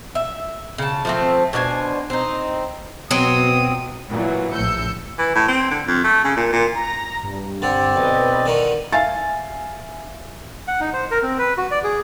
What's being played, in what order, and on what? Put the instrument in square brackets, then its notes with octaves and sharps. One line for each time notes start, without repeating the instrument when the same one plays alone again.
[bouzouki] E5
C#3 A5
F3 A3 C4
B2 D4 C5 G#5
C4 D#4
[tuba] B2 [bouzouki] F#3 C4 [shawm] D#6
[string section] A#2 E3 F#3
A#1 A2 E6 G6 C#7
[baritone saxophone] E3
A2
C4
D3
F2
A3
C#3
A#2
A#2
[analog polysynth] A#5 A#6
G2
[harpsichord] D3 [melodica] C4 D5
[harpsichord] B1 [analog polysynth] B4 D#5
[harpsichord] D3 D#3 [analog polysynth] D#7
[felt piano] E5 F5 G#5 A6
[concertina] F#5
D#4
C5
A#4
C4
B4
F#4
D5
G#4